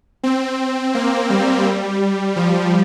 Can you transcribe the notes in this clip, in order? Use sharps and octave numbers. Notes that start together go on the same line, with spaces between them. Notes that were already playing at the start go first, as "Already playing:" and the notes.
C4
A#3
G3
F3